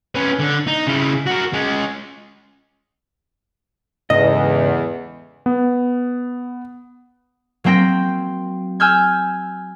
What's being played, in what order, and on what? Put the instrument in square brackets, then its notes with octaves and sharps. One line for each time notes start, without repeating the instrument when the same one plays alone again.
[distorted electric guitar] C#4 B4
D3
D#4
C#3 E4
F#4 A#4
G#3 C#4
[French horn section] E2 [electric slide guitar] G#2 C#3 A4 [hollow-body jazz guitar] D#5
[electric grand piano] B3
[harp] F#3 A#3 C4 G5 A#6
G#5 E6 F6 G6 G#6